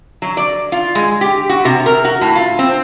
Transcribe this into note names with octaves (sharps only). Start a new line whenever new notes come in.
F#3
D5
F4
G#3
G4
F#4
C3
A#4
F#4
A2
F4
C4